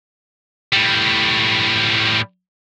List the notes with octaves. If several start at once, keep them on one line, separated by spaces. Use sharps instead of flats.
A2 G3